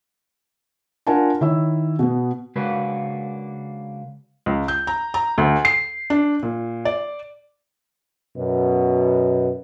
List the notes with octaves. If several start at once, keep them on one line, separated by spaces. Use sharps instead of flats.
D4 F4 A#4 F#5 G#5 A5
D#3 E4 C#5 E6
B2 B3
C#3 G#3 A#3 D4 F#4 B4
C#2
G6
A#5
A#5
D2
C7
D4
A#2
D5
F#2 B2